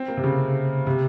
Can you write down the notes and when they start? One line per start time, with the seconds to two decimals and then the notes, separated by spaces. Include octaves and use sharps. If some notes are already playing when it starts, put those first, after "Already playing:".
Already playing: C4
0.08 A#3
0.17 C3
0.24 C#3
0.87 C3